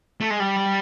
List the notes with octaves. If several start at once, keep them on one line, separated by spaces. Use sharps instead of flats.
A3
G#3
G3